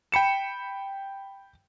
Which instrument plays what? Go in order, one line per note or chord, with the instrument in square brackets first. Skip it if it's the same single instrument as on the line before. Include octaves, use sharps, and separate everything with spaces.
[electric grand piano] G5 B5 C#7 E7